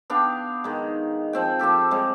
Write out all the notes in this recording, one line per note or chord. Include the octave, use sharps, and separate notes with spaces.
B3 D4 F5 G5
D#3 G#3
F3 C4 G5
C4 F4 G4 A4
G3 G#3 C4